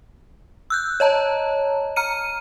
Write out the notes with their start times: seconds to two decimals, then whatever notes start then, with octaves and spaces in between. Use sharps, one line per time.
0.70 E6 F#6 G6
1.00 C#5 D#5 A5 A#5
1.96 A#5 F6 C#7 D#7